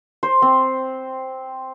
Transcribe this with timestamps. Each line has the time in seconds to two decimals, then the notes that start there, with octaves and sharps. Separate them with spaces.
0.23 C5
0.42 C4